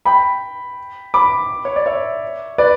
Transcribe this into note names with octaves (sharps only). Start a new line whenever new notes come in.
G5 B5
B5 D6
C#5
D5
C#5 E5
B4 D5